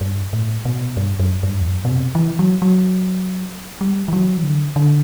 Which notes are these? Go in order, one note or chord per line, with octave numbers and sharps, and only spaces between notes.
G2
A2
B2
G2
F#2
G2
E2
F#2
B2
C3
E3
F#3
F#3
G3
E3
F#3
E3
D3
D3